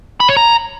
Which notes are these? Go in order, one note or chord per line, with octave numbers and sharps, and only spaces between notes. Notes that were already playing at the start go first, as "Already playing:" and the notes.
B5
C#5
A#5